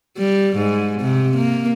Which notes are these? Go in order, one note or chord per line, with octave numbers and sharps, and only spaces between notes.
G3
G#2
C3
A#3